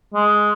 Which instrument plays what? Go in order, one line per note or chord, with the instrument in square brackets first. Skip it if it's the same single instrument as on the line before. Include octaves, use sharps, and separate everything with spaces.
[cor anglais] G#3